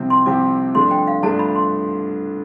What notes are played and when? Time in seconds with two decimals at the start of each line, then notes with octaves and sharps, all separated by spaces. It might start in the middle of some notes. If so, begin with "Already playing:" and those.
Already playing: C2 C3 F3 C4 G4
0.10 C6
0.26 C2 C3 F3 C4 G4 D6
0.75 G2 F3 A3 D4 C6
0.91 G5
1.07 F5
1.23 G2 F3 A3 D4 A5
1.39 B5
1.55 C6